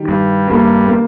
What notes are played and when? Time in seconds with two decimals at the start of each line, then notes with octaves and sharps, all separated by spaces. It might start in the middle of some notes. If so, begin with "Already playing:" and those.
Already playing: D#3 G3
0.09 G2
0.50 G2 G3 A#3
0.87 A#3